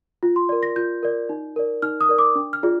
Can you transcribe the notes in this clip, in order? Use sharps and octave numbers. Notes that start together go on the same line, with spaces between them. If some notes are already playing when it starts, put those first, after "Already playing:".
F4
C6
A#4 D5
A#6
F4 G6
A#4 D5
D#4
A#4 D5
D#4 F6
D#6
A#4 D5
D6
D4
F6
F4 G#4 D5